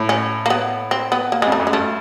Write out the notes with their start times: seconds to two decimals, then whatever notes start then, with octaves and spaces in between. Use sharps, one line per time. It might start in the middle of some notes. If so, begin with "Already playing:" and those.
Already playing: A2
0.09 C#4
0.46 A#3
0.50 B3
0.91 C4
1.12 B3
1.32 A#3
1.42 F2 G#3
1.52 A3
1.60 F#2
1.67 G#3
1.73 G2 A3